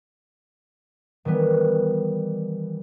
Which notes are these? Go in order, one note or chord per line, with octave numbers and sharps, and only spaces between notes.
D#3 E3 G3 B3